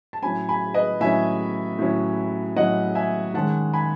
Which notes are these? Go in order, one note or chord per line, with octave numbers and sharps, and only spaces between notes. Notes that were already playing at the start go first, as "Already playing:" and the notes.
A5
A2 F#3 C#4 G#5 B5
G#5 B5
B4 D#5
A2 F#3 C#4 E5 G#5
A2 F#3 C#4
A2 F#3 C#4 D#5 F#5
E5 G#5
D#3 G#3 C#4 F#5 A5
G#5 B5